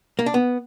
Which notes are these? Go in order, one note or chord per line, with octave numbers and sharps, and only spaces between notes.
A#3
D4
B3